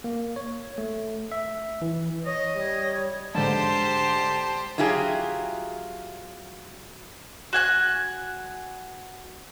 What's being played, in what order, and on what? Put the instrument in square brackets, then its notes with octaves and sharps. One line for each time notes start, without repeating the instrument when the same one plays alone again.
[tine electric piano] A#3
C#5
A3
E5
E3
[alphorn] C#5 [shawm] D#5
[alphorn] G3 [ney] C#5
[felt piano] G#2 D3 [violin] G4 C5 [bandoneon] A5
[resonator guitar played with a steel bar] F#3 E4 F4 G4 G#4
[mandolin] F#4 G#5 F#6